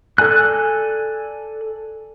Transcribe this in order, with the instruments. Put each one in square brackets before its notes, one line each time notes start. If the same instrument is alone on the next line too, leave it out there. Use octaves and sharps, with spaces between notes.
[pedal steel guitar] A4 D5 G#5 F#6